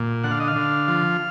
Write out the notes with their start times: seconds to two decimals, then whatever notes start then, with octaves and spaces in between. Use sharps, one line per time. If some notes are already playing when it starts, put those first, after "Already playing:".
Already playing: A#2
0.24 D3 F#5
0.31 F5
0.40 D#5
0.48 F5
0.56 D3
0.88 F3